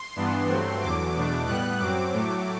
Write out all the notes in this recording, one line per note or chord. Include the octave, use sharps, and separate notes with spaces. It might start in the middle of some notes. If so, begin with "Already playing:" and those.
Already playing: C6
G2 E3 B3 D4
G2 F#3 A3 C4
E2 D3 F#3 D6
E2 B2 A3 D4
A2 G3 B3 F#6
F#2 F#3 C4 D6
A2 F#3 A3